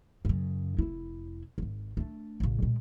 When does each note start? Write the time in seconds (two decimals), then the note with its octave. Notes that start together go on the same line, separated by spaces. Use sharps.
0.25 F#2 C#3
0.79 F1 E4
1.58 D#1 G#1
1.97 A3 D4
2.40 A1 C#3
2.62 A#2 G#3